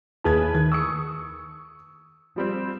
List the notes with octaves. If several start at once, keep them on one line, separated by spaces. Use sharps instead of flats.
D#2 E4 G#4 B4 A5 G#6
D#3 G#6
C#6 D#6 E6 C#7
F3 G3 C4